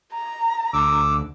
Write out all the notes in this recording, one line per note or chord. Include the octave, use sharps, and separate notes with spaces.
A#5
D2 D6 E6